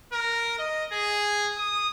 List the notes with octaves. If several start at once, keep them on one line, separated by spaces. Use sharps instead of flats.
A#4
D#5
G#4
D#6